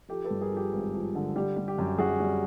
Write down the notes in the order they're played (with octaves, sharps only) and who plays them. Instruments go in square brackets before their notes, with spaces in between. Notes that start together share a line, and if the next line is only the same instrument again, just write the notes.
[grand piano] F3 G4 A4
A4 B4
G2
G#4 A#4
F3
G4
G#1
F3
D3
G3 G4
G3
G4
F#2
F#2 F#4 G#4
G3